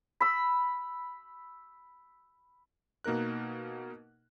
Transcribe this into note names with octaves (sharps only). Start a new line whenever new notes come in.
B5 E6
B2 A#3 D#4 A#4 F#6